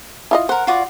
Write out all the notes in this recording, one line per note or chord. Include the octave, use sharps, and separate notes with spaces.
E4 F4 D#5
A#4 C5 F#5
F4 F#4 D5